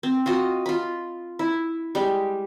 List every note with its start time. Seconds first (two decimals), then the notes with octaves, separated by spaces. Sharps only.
0.03 C4
0.26 F4 F#4 D#5
0.66 F4 B5
1.39 E4
1.95 G3 G#3 G4